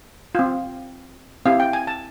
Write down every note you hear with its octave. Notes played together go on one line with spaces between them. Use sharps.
C4 F4
C4 E4 G4 F5
G5
G#5
A5